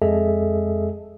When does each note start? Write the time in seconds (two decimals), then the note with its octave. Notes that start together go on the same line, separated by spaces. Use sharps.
0.02 F2 G#3 G#4 A4 D#5 E5